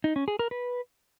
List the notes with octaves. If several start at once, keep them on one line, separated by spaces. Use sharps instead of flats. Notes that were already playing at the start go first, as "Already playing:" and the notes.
D#4
C#4
G#4
A#4
B4